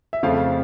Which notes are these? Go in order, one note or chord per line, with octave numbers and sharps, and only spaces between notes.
E5
F2 C#3 F3 A3 F5